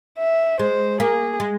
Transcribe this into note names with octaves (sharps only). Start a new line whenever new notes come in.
E5
G#3 C5
A#3 G#4
G#3